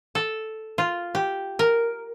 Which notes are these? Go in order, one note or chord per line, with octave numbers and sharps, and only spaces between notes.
A4
F4
G4
A#4